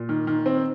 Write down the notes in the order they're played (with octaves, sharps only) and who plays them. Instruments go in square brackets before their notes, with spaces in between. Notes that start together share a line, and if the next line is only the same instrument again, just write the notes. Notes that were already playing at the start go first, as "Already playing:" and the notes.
Already playing: [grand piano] A#2
[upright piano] D#3
D#3
C4